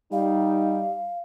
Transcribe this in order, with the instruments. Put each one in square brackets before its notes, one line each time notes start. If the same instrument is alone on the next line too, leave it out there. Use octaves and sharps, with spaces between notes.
[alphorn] G3 [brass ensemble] D#4 [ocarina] F5